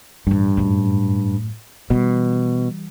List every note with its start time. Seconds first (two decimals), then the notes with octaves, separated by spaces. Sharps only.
0.27 A1 G2 F3
0.57 F#2 A2
1.90 B2 E3 G3